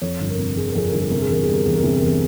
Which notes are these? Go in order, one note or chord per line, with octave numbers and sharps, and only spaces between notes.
F2 C#5
G1
A#4
C3
G1 G#4
A#4
F2 G#4
G1 A#4
G#4
C3 A#4
G#4
E2 A#4
G3 G#4
A#4
E2 G#4
A#4
C3 G#4
A#4
E2 G#4